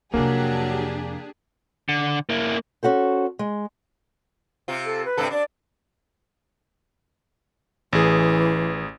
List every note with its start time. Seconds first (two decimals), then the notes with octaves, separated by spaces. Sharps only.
0.14 F2 C3 F#3 A#3 D4 G4 G#4
1.89 D3
2.29 A#3 E4
2.83 C#4 F#4 A4 C5
3.39 G#3
4.68 C3 F4
4.85 A4
5.05 B4
5.17 G2 C3 A4
5.31 D4 D5
7.93 A1 E3 G#4